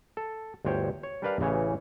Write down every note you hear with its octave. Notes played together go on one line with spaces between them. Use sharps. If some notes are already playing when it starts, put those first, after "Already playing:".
A4
G1 D2 C5 C#5 G5
C#5
G3 D4 A#4 B4 D5 F5
A1 C#3 E3 C#5